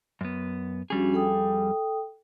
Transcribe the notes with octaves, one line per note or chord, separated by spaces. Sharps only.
F#2 B3
F2 G3 C#4 D4 F#4 G#4
A4 G5 D#6